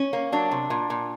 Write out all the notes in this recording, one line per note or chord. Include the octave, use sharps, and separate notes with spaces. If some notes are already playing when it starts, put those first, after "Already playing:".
Already playing: C#4
A#3
F#3 D4
C3
A#2
A#2